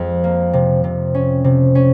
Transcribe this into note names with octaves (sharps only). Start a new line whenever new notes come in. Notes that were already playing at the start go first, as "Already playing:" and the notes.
Already playing: F2 G#3
A#3
C3
C3
C#4
C3
C#4